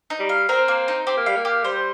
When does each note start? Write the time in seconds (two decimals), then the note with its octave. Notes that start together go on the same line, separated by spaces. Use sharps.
0.10 D#4
0.20 G3
0.29 F5
0.49 C4 A#4
0.68 A#3
0.88 D#4
1.07 C4 G4
1.17 A#3
1.26 G3 F5
1.37 A#3
1.45 G4
1.64 G3 C5